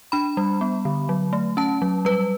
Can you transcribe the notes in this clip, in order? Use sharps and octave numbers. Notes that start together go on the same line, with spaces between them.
D4 B5
G3
B3
D3
F#3
A3
C#4 A5
F#3
G3 B4